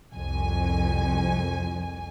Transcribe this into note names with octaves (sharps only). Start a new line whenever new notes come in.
C2 F2 G#5